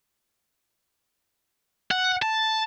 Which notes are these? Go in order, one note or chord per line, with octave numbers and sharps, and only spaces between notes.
F#5
A5